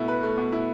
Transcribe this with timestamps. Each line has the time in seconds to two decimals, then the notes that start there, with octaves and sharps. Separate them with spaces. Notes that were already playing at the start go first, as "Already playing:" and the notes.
Already playing: B2 A3 E4
0.08 B4
0.23 A3
0.38 B2
0.52 E4